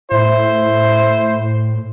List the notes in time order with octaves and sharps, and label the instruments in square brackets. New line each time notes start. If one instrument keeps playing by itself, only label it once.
[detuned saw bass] A2 [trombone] E4 [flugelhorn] C5